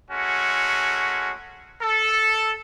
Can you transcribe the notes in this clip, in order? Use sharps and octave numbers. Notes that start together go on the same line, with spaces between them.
G#3 A3 C#4 F#4
A4